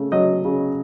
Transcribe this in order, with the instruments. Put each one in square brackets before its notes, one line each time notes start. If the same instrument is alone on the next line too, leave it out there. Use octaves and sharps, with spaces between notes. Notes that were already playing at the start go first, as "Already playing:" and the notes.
Already playing: [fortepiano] C#3 A3
F#3 D#5
C#3